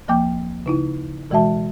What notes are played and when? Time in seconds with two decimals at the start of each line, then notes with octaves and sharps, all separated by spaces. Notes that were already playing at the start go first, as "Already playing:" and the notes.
0.08 D2 F3 A#3 G5 D6 G6
0.66 C#3 D#4 E4
1.30 B2 E3 G#3 F#4 E5 A5